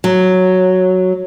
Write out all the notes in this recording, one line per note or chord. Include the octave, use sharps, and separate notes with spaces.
F#3